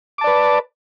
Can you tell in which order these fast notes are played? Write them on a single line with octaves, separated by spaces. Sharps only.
D6 A5 D5 B4